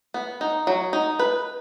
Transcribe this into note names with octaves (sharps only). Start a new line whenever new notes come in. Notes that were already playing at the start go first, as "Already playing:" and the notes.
B3
D#4
F#3
D#4
B4